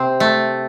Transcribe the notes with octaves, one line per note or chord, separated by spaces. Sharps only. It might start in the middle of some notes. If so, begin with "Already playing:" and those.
Already playing: C3 C4
A3